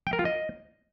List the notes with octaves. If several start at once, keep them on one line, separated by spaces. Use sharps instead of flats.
G5
A#4
F4
D#5